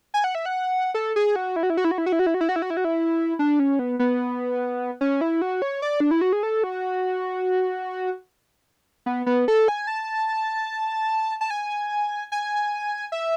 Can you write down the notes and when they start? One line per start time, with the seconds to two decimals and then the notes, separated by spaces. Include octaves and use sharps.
0.14 G#5
0.24 F#5
0.35 E5
0.46 F#5
0.94 A4
1.16 G#4
1.36 F#4
1.56 E4
1.63 F#4
1.70 E4
1.77 F#4
1.84 E4
1.91 F#4
1.98 E4
2.06 F#4
2.12 E4
2.19 F#4
2.26 E4
2.34 F#4
2.41 E4
2.49 F#4
2.56 E4
2.62 F#4
2.70 E4
2.77 F#4
2.85 E4
3.39 D4
3.59 C#4
3.79 B3
3.99 B3
5.01 C#4
5.21 E4
5.42 F#4
5.62 C#5
5.82 D5
6.00 D4
6.11 E4
6.21 F#4
6.33 G#4
6.43 A4
6.64 F#4
9.06 B3
9.26 B3
9.48 A4
9.68 G#5
9.87 A5
11.41 A5
11.50 G#5
12.32 G#5
13.12 E5